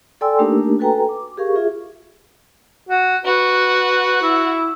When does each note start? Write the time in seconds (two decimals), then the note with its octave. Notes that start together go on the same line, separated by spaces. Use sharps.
0.21 A4 D5 G5 G#5 C6 E6
0.39 A3 A#3 D4 D#4 G4 A#4
0.79 F#4 A4 B4 G5 G#5 A#5
1.09 D6
1.37 G4 G#4 A#4 F5 C#6
1.55 F4 G#4 E5
2.89 F#4
3.25 F#4 B4
4.22 E4